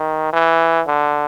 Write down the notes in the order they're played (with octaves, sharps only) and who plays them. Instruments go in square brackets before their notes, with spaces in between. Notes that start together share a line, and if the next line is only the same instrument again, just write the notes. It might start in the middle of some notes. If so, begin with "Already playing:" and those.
Already playing: [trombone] D#3
E3
D3